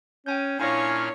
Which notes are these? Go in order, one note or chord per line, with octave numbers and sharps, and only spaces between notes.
C#4 G5 G#5 G6
A#2 C#4 D4 E4 C#5 F5 G#5 A#6